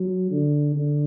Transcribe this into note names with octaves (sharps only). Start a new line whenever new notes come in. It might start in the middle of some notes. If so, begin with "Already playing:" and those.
Already playing: F#3
D3
D3